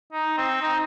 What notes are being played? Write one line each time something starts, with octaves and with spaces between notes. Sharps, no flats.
D#4
C4
D#4